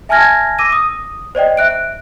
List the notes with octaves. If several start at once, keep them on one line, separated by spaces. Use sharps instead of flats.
E5 G#5 A5 F6 G#6 A#6
D6 E6 A#6 D#7
D#6
C5 D5 D#5 G5
E5 F#6 D7